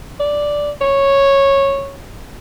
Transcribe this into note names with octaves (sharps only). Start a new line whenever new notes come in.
D5
C#5